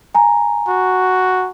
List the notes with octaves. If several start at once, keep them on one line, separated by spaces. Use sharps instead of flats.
G#5 A#5
F#4